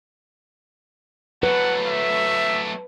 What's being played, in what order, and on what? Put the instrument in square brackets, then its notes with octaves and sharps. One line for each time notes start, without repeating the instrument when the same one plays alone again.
[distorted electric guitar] F#3 A3 [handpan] B4 [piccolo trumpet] F#5
[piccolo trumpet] E5